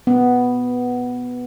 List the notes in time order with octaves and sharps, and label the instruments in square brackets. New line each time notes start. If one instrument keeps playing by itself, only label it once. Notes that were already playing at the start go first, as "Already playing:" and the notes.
[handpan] B3